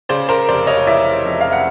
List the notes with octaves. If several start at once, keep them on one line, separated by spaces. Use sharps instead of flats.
C#3 C5 D5
A#4 C5
F1 C5 D5
C#5 D#5
E3 D5 E5
F2
F5
F#5